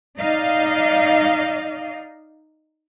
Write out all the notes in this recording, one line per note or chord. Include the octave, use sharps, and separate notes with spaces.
D#4 D5 D#5 F5